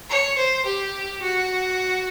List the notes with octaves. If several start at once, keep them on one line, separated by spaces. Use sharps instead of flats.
C#5
C5
G4
F#4